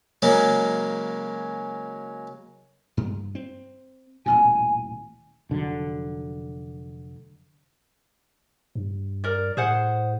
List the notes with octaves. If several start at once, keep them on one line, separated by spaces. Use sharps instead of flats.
C#3 F#3 G#3 A#3
G2
C4
D#1 A1 B2 G#5
F1 D3 F#3
G2
A#4 D5
A2 G#4 C5 F#5